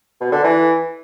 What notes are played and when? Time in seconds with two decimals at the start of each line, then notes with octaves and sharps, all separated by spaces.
0.21 B2
0.32 D3
0.44 E3